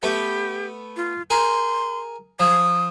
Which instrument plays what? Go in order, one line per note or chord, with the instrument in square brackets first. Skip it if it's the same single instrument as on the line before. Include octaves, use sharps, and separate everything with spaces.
[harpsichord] A3 B3 [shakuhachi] G4
[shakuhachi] F4
[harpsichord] G#4 A#4 [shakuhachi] C6
[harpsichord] F3 [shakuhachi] D#6